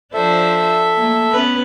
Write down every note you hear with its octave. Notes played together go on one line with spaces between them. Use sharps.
F3 D4 A4 C5 E5
A3 A#3
B3 C#4 B4